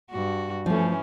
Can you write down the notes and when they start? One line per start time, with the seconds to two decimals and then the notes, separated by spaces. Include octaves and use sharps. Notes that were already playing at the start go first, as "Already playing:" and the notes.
0.11 G2 F#4
0.66 E3 F3 A3 C#4